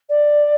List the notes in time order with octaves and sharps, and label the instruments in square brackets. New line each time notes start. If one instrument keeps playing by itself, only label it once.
[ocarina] D5